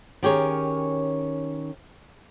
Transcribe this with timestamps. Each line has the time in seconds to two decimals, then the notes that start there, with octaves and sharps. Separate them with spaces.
0.23 D#3 C#4 G4 G#4 A#4 C#5